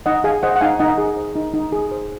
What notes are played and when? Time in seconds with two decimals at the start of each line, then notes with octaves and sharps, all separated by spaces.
0.06 D#4 D#5 F#5
0.24 G#4 F5 G#5
0.43 C5 D#5 F#5
0.56 F#5
0.61 D#4 F5 G#5
0.80 D#4 D#5 F#5
0.98 G#4
1.17 C5
1.36 D#4
1.54 D#4
1.72 G#4
1.91 C5